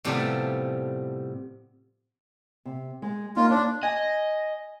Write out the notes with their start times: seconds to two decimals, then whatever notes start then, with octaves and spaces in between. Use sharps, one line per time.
0.04 A2 C3 F3 G3 A3 B3
2.65 C3
3.02 G#3
3.36 A#3 C#4 D#4 F4
3.50 D4 C#5
3.83 D#5 G#5